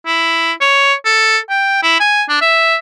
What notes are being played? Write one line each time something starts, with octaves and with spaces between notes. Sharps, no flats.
E4
C#5
A4
G5
E4
G#5
D4
E5